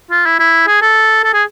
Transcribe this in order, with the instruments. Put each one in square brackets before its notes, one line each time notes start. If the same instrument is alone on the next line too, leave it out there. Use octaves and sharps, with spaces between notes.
[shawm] F4
E4
E4
G#4
A4
A4
G#4